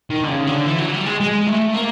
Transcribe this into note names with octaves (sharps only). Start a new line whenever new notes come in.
D#3
D3
C#3
D3
E3
F#3
G3
G#3
G#3
A3
A#3